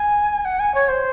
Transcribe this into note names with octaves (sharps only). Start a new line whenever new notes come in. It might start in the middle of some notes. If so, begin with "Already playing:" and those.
Already playing: G#5
F#5
G#5
C#5
C5